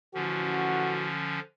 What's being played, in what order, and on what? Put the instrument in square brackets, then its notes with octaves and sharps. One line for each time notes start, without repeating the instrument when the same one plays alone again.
[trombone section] A1 F#4 [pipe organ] D3 F3 C#4